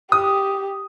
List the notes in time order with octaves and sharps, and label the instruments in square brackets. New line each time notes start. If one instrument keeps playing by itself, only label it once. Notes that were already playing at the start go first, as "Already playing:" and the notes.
[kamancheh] G4 [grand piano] D#6